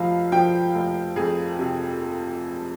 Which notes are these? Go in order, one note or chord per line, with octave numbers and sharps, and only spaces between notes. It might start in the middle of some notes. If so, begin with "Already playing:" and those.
Already playing: F1 F3 F5
F3 G5
F1
F2 G#4
C3